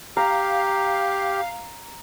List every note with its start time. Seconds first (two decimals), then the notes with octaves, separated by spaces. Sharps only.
0.17 G4 F5 A#5